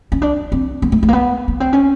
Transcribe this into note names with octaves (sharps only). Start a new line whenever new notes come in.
C#4
D4
C4
B3
A3
A3
A#3
B3
B3
C4
C#4